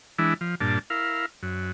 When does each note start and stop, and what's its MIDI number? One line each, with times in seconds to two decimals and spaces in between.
0.18 0.34 52
0.18 0.34 56
0.18 0.34 62
0.18 0.34 64
0.41 0.55 53
0.61 0.79 43
0.61 0.79 46
0.61 0.79 62
0.61 0.79 81
0.90 1.26 64
0.90 1.26 70
0.90 1.26 77
1.43 1.72 42